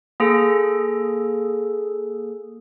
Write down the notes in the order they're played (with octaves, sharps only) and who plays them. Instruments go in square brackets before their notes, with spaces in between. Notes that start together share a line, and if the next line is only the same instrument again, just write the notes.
[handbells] A#3 G#4 A4